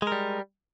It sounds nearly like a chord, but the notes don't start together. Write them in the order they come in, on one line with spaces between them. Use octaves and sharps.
G#3 A#4 G3